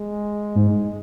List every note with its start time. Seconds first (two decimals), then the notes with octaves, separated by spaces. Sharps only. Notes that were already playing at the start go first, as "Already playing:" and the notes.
Already playing: G#3
0.55 G#2